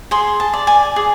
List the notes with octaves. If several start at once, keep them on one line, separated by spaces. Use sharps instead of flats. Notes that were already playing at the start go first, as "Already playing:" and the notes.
G#4 C6
A5
D5
G#5
G#4